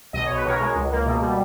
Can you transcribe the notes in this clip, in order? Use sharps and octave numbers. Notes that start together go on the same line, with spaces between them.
B1 D#5
B1 C#5
B4
B2 A#4 C#5
G#3
C#2
A#3
B2
G3